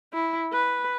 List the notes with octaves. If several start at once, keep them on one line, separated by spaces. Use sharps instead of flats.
E4
B4